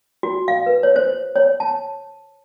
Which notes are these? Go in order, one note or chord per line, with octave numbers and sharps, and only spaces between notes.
F#4
F5
B4
C#5
C5
C#5
A5